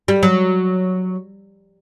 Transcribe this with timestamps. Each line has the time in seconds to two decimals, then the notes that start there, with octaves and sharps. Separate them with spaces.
0.08 G3
0.23 F#3